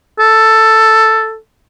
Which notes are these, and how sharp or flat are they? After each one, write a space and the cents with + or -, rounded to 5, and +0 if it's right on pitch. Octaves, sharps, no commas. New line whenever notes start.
A4 +5